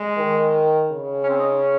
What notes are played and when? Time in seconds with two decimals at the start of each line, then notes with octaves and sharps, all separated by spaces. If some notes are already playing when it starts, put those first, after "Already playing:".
Already playing: G#3
0.17 D#3
0.92 C#3
1.23 C#4
1.29 C4
1.38 D#4
1.57 C#4